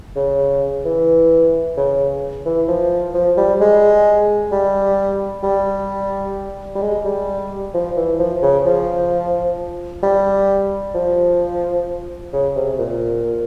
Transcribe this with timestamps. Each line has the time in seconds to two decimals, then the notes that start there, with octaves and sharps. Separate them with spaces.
0.16 C#3
0.85 E3
1.77 C#3
2.45 E3
2.68 F3
3.14 F3
3.37 G3
3.61 G#3
4.52 G3
5.43 G3
6.75 G3
6.82 G#3
7.05 G3
7.74 F3
7.97 E3
8.19 F3
8.42 C#3
8.65 F3
10.03 G3
10.94 F3
12.33 C#3
12.56 C3
12.79 A#2